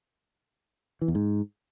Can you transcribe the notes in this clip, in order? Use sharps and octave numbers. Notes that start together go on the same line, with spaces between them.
E3
E2
G#2